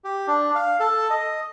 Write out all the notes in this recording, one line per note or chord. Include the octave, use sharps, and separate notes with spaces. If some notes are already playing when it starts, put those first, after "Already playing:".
G4
D4
F5
A4
D#5